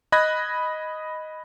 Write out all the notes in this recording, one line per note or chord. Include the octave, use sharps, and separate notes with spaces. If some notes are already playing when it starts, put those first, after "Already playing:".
D#5 B5 F#6 G#6 A#6